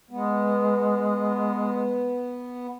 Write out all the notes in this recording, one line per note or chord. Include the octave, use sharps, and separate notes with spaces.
G#3 B3